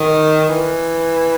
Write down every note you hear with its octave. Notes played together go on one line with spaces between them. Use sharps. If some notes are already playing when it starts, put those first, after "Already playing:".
Already playing: D#3
E3